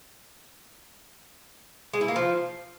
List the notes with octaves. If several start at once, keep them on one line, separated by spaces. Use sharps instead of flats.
G#3
E4
A#3
F3